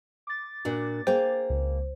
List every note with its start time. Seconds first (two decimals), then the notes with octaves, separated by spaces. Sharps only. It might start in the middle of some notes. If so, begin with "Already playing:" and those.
0.27 D6 A6
0.65 A#2 D4 F#4
1.07 A#3 G#4 C5 G5
1.50 C#2